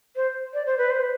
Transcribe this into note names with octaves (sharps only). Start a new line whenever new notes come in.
C5
D5
C5
B4
C5